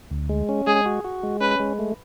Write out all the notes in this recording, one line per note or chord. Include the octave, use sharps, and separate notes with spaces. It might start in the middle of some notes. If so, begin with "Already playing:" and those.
D2
G#3
C#4
G#3 G#4
F#4
F#4
G#3
C#4 B4
G#3
A3